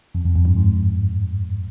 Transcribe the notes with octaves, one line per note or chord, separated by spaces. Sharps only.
F2
F2
F2
G2
G#2